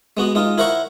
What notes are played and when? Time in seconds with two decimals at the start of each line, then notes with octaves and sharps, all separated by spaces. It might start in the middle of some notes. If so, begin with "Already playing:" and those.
0.17 G#3 B3 F#4
0.35 G#3 D#4 F4
0.58 E4 A#4 C5 F#5 A#5 C#6